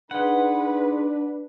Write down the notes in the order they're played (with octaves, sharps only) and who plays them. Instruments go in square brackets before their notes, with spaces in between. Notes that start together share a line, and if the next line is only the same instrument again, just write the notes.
[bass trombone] D4 [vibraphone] D#4 G#4 C6 [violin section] B4 [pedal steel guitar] F#5